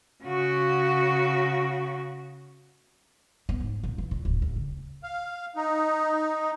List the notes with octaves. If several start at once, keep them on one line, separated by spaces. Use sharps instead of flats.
C#3 F#4
B3
G#2
A#2
E3
A#2
D1
D1
C#3
F5
D#4